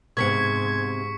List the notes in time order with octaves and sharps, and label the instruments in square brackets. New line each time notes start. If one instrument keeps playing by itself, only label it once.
[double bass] G#2 [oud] C3 B3 C4 [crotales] C#6 B6 C#7 [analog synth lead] G#6